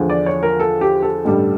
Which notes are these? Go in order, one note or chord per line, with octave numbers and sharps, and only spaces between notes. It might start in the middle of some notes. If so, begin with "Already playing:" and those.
Already playing: E2 D3 F3
D5
C#5
A#4
A4
G4
A4
A1 G2 D3 G3